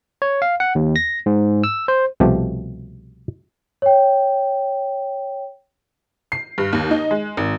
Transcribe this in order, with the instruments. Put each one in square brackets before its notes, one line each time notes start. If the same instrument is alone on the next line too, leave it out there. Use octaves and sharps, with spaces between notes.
[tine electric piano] C#5
F5
F#5
D#2
A#6
G#2
E6
C5
[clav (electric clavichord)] C2 B2 F3 A3 G4
[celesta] C#5 G5
[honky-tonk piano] C7
G2
D#2
D#4
G#3
G#1